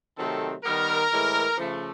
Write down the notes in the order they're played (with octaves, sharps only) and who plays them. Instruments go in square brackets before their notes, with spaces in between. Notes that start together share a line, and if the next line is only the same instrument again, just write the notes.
[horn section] C3 D#3 F#3 A3 C4 A4
D#3 G3 B3 A#4
A2 E3 G#3
C#3 F3 A3